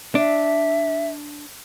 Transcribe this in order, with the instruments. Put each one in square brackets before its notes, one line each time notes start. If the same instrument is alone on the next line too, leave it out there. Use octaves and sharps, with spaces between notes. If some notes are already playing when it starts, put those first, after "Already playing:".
[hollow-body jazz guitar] D4 [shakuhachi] E5